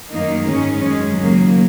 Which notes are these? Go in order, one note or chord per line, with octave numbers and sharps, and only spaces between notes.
F#2 D#3 A#3 D#4
G#2 D#3 G#3 C#4
F#2 D#3 G#3
D#2 C#3 F#3 A#3